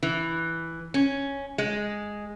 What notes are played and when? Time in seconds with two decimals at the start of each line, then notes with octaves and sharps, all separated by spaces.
0.03 E3
0.94 C#4
1.58 G#3